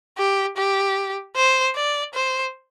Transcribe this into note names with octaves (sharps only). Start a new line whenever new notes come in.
G4
G4
C5
D5
C5